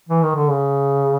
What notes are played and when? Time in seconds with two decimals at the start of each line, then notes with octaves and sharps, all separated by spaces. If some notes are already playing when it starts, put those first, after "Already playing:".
0.09 E3
0.23 D#3
0.36 D3
0.50 C#3